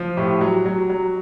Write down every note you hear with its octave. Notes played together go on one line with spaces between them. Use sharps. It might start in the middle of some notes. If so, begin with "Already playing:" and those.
Already playing: F3
A2 G4
F#3
F#3
F#3